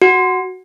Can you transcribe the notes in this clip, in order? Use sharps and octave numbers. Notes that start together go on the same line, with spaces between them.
F#4